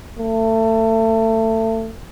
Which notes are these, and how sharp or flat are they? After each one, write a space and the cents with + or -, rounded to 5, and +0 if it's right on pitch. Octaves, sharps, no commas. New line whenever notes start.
A3 +25